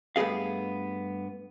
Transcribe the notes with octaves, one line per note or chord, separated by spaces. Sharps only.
G2 A3 B3 G#4 F5